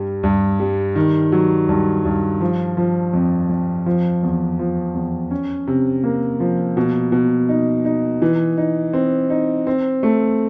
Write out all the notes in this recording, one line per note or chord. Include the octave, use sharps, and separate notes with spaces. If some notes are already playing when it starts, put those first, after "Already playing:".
Already playing: G2 G3
G2
G3
D#3
F#3
G2
G2
F3
F3
F2
F2
F3
E2
F3
E2
C#4
C3
A#3
F3
B2
B2
D#4
D#4
E3
D#4
C4
D#4
C4
A3